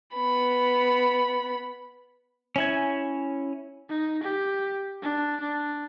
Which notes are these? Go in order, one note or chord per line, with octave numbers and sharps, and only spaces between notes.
B3 B5
C#4 E4 G#5
D#4
G4
D4
D4